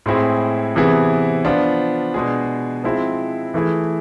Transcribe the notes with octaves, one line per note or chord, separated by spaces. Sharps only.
A2 G#3 C4 E4 G#4
C3 E3 B3 E4 G#4
F3 B3 D4 F4
B2 G#3 D4 G#4
F3 G#3 C4 E4
E3 A3 E4 G#4